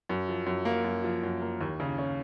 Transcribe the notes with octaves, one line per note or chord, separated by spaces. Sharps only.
F#2
F3
F#2
A#3
F#2
F3
F#2
A#3
D#2
C#3
C#4